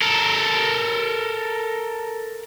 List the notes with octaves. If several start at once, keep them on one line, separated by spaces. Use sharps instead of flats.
A4 A#4